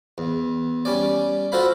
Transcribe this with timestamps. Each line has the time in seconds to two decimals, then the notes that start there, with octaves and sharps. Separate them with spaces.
0.18 E2
0.85 G3 C#4 D5
1.52 F4 F#4 A4 C5 F5 B5